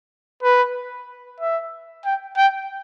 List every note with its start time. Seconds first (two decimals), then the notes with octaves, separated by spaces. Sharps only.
0.43 B4
1.40 E5
2.05 G5
2.37 G5